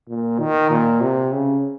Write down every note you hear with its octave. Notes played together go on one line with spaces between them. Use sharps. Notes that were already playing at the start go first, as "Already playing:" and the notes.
A#2
D#3
A#2
C3
C#3